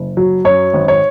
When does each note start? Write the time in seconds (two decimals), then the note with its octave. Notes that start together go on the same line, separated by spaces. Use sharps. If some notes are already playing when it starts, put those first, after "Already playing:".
Already playing: F#1
0.17 F#3
0.45 F#2 C#5
0.74 G#1
0.88 C#5